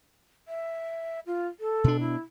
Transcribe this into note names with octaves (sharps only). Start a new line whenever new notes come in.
E5
F4
A4
B2 D4
E4